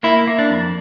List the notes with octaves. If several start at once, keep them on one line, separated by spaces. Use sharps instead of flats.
A#3 E4
A#3
D4
F2